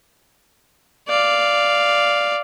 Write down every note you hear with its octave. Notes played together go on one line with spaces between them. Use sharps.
D5 F5